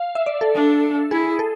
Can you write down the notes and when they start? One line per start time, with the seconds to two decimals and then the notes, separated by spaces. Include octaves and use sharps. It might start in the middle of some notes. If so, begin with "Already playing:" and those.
Already playing: F5
0.15 E5
0.26 D5
0.41 A4
0.55 D4
1.11 E4 G#4
1.39 A4